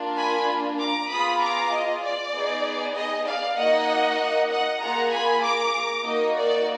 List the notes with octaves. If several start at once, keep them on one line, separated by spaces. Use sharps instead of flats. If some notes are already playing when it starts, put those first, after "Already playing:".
Already playing: A#3 D4 F4
G#5 B5
A#5 D6
B3 F4 G#4 B5 D#6
A#5 D6
D#5
D5
B3 D#4 G#4
D#5
D5 F5
A#3 D#4 F#4 D#5 F#5
D#5 F#5
A#3 F4 G#4 F#5 A#5
G#5 B5
A#5 D6
A#3 D#4 F#4 D#5
D5